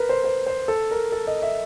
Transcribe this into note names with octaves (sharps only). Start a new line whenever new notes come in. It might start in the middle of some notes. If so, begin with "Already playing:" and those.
Already playing: A#4 B4
C5
C5
C5
A4
A#4
A4
D#5
E5